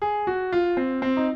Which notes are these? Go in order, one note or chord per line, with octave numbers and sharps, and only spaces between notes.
G#4
F#4
F4
C4
C4
D#4